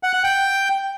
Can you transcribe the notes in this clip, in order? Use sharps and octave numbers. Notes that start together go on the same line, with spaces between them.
F#5
F#5
G5